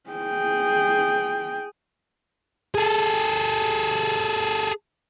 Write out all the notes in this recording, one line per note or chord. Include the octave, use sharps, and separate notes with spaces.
G#4 G5
G#4 A4